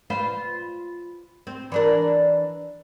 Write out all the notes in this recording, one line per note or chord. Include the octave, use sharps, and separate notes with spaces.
F4 B4 C5
C4
E3 D4 A#4